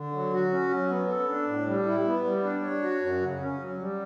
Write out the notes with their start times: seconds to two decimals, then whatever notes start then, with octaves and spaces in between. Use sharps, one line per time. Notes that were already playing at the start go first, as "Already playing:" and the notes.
Already playing: D3
0.13 F#3
0.32 F#4
0.51 C#4
0.71 F#3
0.90 B3
1.09 A4
1.28 D4
1.47 A2
1.66 G3
1.86 E4
2.05 B3
2.24 G3
2.44 D4
2.63 C#5
2.82 F#4
3.01 F#2
3.21 C#3
3.40 C#4
3.59 F#3
3.78 G3